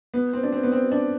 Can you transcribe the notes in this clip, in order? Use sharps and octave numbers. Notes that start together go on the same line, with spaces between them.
B3
C4
D4
C4
B3
C4
D4